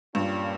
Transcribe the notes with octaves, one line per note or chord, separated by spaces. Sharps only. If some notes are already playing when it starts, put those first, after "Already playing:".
G2 A#2 G3 C#4 F4